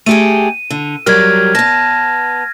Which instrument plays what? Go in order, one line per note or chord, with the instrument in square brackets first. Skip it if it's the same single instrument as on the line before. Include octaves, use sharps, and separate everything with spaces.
[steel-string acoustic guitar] A3 G4 G#4 [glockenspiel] D#7
[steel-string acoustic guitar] D3
[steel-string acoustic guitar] F#3 G3 A#4 [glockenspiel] F6 G#6
[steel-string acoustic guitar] B3 A5 [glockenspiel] A#6